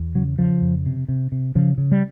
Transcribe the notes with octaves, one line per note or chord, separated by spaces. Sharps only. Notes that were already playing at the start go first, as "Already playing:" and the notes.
Already playing: E2
C#3 F#3
C#3 F3
F2
C3
C3
C3
C#3 F3
C#3
G3